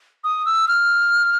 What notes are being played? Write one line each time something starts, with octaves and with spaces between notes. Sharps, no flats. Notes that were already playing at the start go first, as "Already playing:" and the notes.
D#6
E6
F6